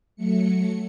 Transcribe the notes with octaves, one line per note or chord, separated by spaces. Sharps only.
F#3 A3 C#7